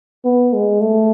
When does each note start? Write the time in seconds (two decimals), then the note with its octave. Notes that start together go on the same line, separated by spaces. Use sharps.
0.25 B3
0.54 G#3
0.81 A3